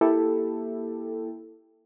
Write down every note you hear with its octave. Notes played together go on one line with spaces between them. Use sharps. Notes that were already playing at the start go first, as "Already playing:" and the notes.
A#3 E4 G4 A4